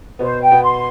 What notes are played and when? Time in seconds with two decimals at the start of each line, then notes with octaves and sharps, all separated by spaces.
0.19 B2 B3 C5
0.41 G5
0.51 B2 B3
0.62 C6